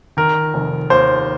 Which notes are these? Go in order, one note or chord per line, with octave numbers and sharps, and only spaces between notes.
D#3 A#4
F1
D#2 C5